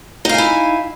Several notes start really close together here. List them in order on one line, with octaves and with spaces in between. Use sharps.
D#4 F5 G#5 E4